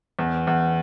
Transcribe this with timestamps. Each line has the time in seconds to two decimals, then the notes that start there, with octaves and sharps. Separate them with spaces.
0.19 E2
0.47 E2